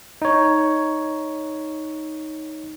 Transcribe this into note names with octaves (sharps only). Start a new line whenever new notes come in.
D#4 C#5